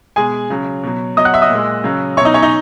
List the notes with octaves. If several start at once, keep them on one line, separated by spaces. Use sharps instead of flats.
B2 G#3 G#4 G#5
C#3 F#3
B2 F#3
B2 F#3 D#5 D#6
F#5 F#6
E5 E6
D#5 D#6
A#2
G#3
C#3 F#3
B2 F#3 C#5 C#6
D#4 D#5
C#4 C#5
D#4 D#5